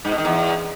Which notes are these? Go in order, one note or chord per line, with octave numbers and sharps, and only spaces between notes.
G#2
B2
D#3
E2